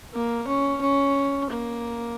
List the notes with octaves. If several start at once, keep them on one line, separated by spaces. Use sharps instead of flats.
A#3
C#4
C#4
A#3